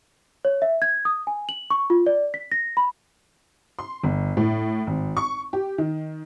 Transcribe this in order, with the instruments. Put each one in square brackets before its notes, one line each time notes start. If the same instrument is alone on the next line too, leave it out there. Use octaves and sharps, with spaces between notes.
[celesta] C#5
E5
G#6
D#6
G#5
F#7
C#6
F4
D5
B6
A#6
B5
[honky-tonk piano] C6
G1
A2
G#1
C#6
G4
D#3